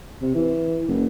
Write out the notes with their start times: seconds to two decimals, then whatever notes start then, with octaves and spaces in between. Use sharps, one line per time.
0.22 C3
0.35 E3
0.89 F#1